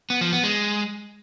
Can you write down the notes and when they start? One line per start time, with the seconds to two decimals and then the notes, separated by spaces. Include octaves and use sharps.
0.10 B3
0.21 F3
0.32 B3
0.43 G#3